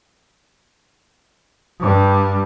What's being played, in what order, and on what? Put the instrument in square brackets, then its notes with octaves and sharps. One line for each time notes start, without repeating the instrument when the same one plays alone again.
[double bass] G2 G3